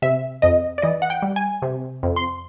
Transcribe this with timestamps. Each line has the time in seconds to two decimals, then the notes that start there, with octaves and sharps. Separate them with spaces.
0.02 C3 E5
0.42 F2 D#5
0.78 D5
0.82 E3 D#5
1.02 F#5
1.10 G5
1.22 G3
1.36 G#5
1.62 C3
2.03 F2
2.16 C6